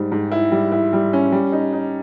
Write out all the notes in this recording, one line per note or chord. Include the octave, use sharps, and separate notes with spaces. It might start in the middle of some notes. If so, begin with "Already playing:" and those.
Already playing: G#2 G3
G#2
E4
G3
E4
G3
C#4
G3
D#4
D#4